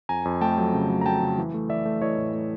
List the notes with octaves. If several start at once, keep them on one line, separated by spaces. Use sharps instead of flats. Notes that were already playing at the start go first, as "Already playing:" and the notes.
F2 G#5 A#5
F2
A3 G5 A5
F#3
C#3
F#3
A#5
F#3 G5 A5
C#3
E3
A3
E3 D5 E5
A3
E3 C#5 D#5
A2
A3